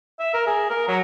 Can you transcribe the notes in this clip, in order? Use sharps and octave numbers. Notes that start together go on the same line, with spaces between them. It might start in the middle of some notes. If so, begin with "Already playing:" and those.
E5
A#4
G#4
A#4
F#3